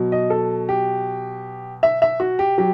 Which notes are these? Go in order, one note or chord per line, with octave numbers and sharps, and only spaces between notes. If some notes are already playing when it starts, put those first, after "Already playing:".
Already playing: B2 F#3
D#5
A4
G4
E5
E5
F#4
G4
F#3 G4